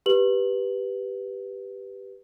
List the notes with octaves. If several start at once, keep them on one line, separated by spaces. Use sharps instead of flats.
G4 B4 F#7